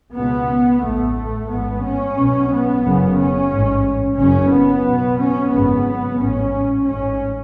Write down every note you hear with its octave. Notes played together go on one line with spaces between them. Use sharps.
C#2 B2 B3
A1 A2 A3
A1 G#2 B3
C#4
B1 B2
B3
F#1 F#2 C#3
C#4
A1 G#2
F#1 F#2 C#3 C#4
B3
B1 B2
C#4
G#1 F#2 C#3 B3
A1 G#2 C#4
A1 G#2 C#4